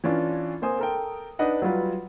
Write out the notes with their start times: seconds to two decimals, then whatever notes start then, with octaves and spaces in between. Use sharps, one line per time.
0.04 E3 C#4 D4 F4
0.62 A#3 C4 C5 G#5 D#6
0.79 A4 A#4 G5
1.39 D4 D#4 B4 D#5 F#5
1.62 F#3 G3 F4 B4